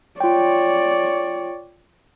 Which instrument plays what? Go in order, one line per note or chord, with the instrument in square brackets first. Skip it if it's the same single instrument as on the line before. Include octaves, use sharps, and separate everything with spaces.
[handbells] F4 G5 [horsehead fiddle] C#5 D5